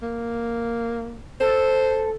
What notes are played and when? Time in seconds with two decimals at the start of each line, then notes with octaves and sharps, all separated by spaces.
0.02 A#3
1.40 A4 C5